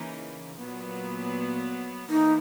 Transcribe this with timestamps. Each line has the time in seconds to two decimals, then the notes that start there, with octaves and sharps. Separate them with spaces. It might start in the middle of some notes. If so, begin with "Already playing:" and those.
Already playing: C#3 E3 A#3 D#4
0.58 A#2 F#3 B3
2.10 E3 A#3 D#4